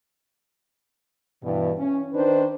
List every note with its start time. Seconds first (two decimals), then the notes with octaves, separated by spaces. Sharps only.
1.43 G2 B2 E3
1.78 C#4
2.13 D#3 D4 D#4 B4 C5